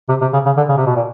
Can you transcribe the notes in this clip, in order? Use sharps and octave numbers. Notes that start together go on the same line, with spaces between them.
C3
C3
C#3
C#3
D3
C#3
C3
B2
A#2